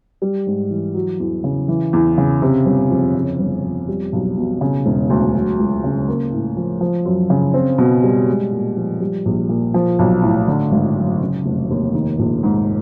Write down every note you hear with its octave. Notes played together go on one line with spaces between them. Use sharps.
G3
G#2
E3
F#3
E2
C#3
E3
E2
C#3
C3
G1
F2
C#3
G1
F2
G3
B1
B2
C#3
E1
D2
F#3
C#2
C#3
A#3
A2
F3
F3
F#2
C#3
C4
B2
G3
G#3
A#2
F3
G3
A#1
A#2
F3
B1
A2
D3
G#1
F#2
C#3
F1
D#2
D#3
A#1
G#2